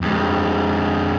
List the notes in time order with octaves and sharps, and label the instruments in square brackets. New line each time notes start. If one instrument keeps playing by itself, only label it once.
[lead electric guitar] F2 G#3